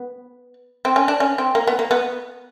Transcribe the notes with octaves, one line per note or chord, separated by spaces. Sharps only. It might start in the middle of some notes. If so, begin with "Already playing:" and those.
Already playing: B3
C4
C#4
D4
C#4
C4
A#3
B3
A#3
B3